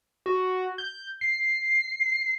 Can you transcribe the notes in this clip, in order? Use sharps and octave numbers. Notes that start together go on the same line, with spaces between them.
F#4
G6
C7